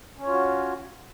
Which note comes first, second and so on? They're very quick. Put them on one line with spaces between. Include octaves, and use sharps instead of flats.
C#4 C#5 F4 F#4